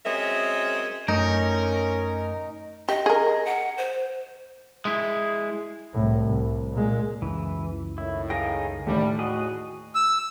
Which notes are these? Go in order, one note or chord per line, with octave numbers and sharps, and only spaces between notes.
F#3 G#3 C4 C#4 A#4 E5
F#2 A3 C#4 D#4 A#4
G4 D#5
G#4 A#4
F#5
C5
G#3 E4
C2 A2
C2
A#2 G#3
C#2 F#2 E3
A2 D#3 E4
D#4 G#4 F5 G5 A#6
D#2 A2 G3 A3
F#4 G#4 D#5
E6